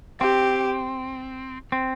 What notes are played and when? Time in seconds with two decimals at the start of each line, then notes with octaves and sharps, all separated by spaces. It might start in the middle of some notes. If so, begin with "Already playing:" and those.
0.21 C4 G4
1.72 C4